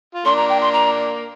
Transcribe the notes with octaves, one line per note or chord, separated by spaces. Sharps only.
F4
A#3 D4 C6
A#5
G5
C6
A#5